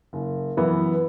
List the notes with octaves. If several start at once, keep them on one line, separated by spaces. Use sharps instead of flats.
F#1
F#2 E3 B3